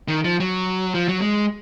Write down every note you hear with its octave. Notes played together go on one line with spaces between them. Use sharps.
D#3
F3
F#3
F3
F#3
G#3